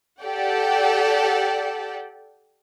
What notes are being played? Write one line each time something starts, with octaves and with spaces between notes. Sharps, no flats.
G4 A4 D5 F#5 G5